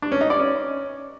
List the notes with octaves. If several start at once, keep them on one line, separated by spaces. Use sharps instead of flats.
D4
C#4
D#4
D5
C#4